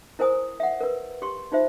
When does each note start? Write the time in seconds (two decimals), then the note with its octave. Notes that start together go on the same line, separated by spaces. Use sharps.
0.19 E4 A#4 C5 G#5 D#6
0.60 E5 F#5
0.81 A#4 B4
1.22 G4 C6 C#6
1.52 D#4 F4 C5 E5